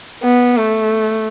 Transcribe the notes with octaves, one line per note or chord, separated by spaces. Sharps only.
B3
A3